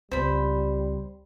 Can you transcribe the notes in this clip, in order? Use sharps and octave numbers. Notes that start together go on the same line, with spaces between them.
C#2 G3 C4 C5 B5